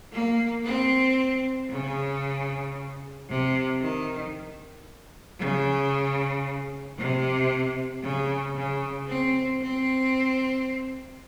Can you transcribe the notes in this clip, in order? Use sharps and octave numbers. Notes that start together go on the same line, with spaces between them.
A#3
C4
C#3
C3
D#3
C#3
C3
C#3
C#3
C4
C4